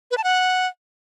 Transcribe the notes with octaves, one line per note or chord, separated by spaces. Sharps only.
B4
A5
F#5